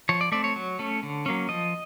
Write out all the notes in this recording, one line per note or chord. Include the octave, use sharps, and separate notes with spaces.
F3 C#5
D5
A3 C4 D5
C#5
F#3
A3 C#4
D3
F#3 A#3 C#4
F3 D#5